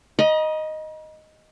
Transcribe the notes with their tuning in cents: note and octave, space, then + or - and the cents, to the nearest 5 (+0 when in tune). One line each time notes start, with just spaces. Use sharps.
D#5 +0 A#5 +45